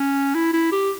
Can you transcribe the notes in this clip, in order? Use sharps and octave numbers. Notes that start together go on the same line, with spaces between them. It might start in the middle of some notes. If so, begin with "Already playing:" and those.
Already playing: C#4
E4
E4
G4